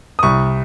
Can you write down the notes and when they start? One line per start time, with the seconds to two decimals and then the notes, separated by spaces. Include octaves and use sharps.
0.19 D#6
0.23 C2 C#6